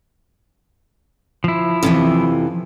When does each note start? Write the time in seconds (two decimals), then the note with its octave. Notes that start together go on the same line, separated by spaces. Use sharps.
1.44 F3 E4
1.83 F2 C3 E3